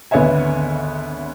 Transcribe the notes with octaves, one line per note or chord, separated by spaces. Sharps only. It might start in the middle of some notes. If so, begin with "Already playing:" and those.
G#1 D2 B3 C#5 E5 G#5